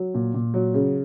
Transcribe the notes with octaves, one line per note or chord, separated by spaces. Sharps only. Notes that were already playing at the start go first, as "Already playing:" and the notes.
Already playing: F#3
A#2
A#2
F#3
C#3